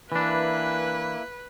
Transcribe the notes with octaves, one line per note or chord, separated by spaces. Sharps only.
E3 A#3 D4 E4 B4 E5